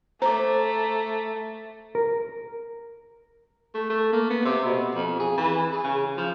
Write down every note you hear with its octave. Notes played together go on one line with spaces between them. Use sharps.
A3 C5 A#5 D6
A#4
A3
A3
A#3
B3
C3
B2
F2
G#4
E3
G#4
C#3
F3